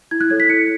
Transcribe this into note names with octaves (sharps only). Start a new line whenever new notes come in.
E4 G#6
F#6
A4 C#5 G#6
B6
E4 C#7